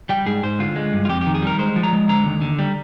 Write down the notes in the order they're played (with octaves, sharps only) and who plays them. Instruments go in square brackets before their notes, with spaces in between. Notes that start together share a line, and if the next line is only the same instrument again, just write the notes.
[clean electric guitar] G3 G5
G#2 G#4
G#2 C5
D3 F4
G#3
G2
F4
F2 G4
G4
D#3
G#4
G3 A#4
G#3 C5
F3
A#5
G#3
D3 A#5
D#2
D3
G3